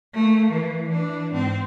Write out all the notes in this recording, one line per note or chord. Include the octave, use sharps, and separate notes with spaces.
A3 A#3
E3
E3 D4
G#2 C4